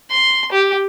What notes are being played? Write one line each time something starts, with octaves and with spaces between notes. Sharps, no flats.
C6
G4